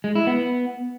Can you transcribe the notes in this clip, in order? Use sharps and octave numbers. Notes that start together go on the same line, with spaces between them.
G#3
E4
B3